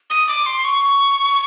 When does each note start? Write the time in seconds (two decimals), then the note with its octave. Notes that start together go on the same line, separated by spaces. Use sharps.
0.10 D#6
0.28 D6
0.46 C6
0.64 C#6